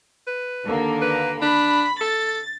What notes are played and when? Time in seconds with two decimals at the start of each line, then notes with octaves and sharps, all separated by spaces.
0.27 B4
0.65 D#2 D3 A#3
1.01 B4
1.42 D4 B5
2.01 A4 A6